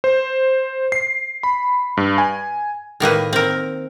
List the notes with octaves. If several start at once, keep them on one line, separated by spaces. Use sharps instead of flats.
C5
C7
B5
G2
G#5
A2 D#3 A#3 B4
C4 A#4